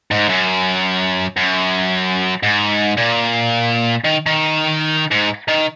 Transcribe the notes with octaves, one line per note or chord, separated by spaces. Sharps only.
G#2
F#2
F#2
G#2
A#2
D#3
D#3
G#2
D#3